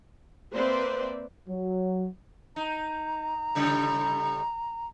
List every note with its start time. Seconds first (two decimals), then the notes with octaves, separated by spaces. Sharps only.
0.52 A#3 C4 B4 C5 D5 E5
1.49 F#3
2.56 D#4 A#5
3.55 A2 C#3 G3